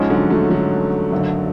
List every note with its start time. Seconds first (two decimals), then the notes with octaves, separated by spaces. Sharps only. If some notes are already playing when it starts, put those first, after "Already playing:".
Already playing: G#2 F3 G#3 C#4
0.10 D3 F#3
0.30 F#3 A3
0.50 D3 F#3
1.11 G#1 F#2 D3